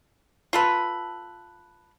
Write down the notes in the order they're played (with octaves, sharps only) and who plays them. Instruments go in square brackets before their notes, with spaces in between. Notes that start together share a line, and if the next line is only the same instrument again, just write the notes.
[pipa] F4 A4 B4